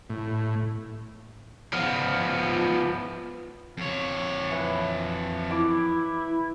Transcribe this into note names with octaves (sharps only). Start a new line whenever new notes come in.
A2
F3 B3
F2 C#5
E3
E4 D6